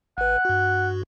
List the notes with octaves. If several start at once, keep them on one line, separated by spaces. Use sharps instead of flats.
G#1 B4 F#5
G2 F#4